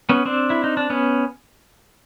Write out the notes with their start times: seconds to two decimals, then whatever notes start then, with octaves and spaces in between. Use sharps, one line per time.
0.09 B3 C#4
0.25 C4 D4
0.50 E4
0.64 D#4
0.77 D4
0.90 B3 C#4